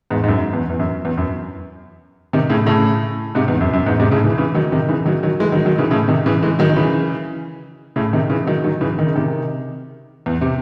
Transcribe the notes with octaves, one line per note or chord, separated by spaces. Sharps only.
E2 G#2
G#2
F#2
E2
E2
F#2
E2
F#2
C3 D#3
A2 C#3
A2 C#3
G#2 C3
E2
F#2
F#2
E2 G#2
G#2 C3
A2 C#3
C#3 E3
C#3 E3
D#3 F#3
C3 D#3
C#3 E3
D#3 F#3
D#3 F#3
E3 G#3
D#3 F#3
D#3 F#3
C#3 E3
A2 C#3
C3 D#3
C#3 E3
E3 G#3
D#3 F#3
D#3
C#3 E3
A2 C#3
C3 D#3
C#3 E3
D#3 F#3
D#3 F#3
C#3 E3
D#3
C#3
C3 D#3
E2
C3